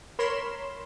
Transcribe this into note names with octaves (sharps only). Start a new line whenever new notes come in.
A#4 C#5 B5 C6 E7